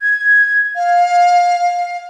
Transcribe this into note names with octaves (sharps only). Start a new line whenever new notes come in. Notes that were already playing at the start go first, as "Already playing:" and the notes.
G#6
F5